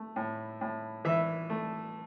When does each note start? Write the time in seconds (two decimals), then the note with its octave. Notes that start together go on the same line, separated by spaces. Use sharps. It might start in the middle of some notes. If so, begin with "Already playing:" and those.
Already playing: A3
0.16 A2
0.61 A2
1.05 E3 E5
1.50 A3